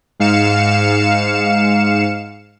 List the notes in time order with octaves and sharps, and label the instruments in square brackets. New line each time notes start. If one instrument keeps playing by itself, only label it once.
[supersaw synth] G#2 F5 C#7 E7